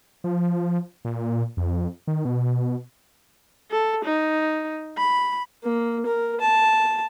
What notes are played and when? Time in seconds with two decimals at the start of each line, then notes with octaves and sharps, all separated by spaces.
0.24 F3
1.05 A#2
1.57 F2
2.07 D#3
2.25 B2
3.71 A4
4.05 D#4
4.98 B5
5.63 A#3
6.06 A#4
6.41 A5